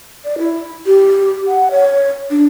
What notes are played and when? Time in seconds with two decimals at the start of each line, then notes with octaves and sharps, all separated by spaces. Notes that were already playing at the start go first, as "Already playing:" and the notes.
0.25 D5
0.38 E4
0.86 G4
1.48 F#5
1.71 C#5
2.30 D4